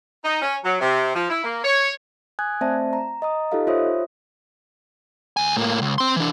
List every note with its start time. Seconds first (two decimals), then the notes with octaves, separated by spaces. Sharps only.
0.24 D#4
0.41 C#4
0.64 F#3
0.80 C3
1.15 F3
1.29 E4
1.43 A#3
1.64 C#5
2.39 G#5 D#6 F#6 G#6
2.61 A3 C4 C5 D5 E5 A5
2.93 A#5
3.22 D#5 A#5 D#6
3.52 D#4 F4 G4 A4 D#5 F5
3.67 F4 C5 C#5 E5 D#6
5.37 D2 G#5
5.57 A2 A#3
5.82 C#2
5.98 C4 C6
6.16 E3 D4